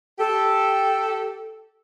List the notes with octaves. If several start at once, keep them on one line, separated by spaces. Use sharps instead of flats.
G4 A4